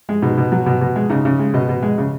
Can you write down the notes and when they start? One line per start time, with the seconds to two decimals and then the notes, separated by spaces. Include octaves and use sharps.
0.09 G#3
0.22 B2 D#4
0.38 B2
0.52 F#3
0.66 B2
0.81 B2
0.96 G#3
1.10 C#3 D#4
1.25 C#3
1.39 G#3
1.54 B2 D#5
1.69 B2
1.83 G#3
1.98 C#3